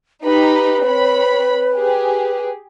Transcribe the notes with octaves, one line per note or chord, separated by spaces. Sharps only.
D#4 G4 B4 B5
C4 C#5 B5
G4 G#4